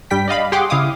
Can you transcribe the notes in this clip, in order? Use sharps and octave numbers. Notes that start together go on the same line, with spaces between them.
G2 G3 G5 B6
D5 D#5 F5 B5
G4 G#4 F#5 G5 C6 D6
C#3 E4 F5 D6 D#6